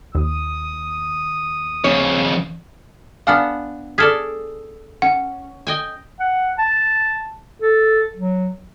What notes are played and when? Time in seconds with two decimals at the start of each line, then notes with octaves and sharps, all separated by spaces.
0.15 D#2 D#6
1.84 F2 C#3 C#5
3.27 B3 D4 F5 F#5 G#5 F6
3.98 G#4 A4 D5 F6 G#6 B6
5.02 C#4 F#5
5.67 D#5 G5 G#5
6.20 F#5
6.59 A5
7.62 A4
8.16 F#3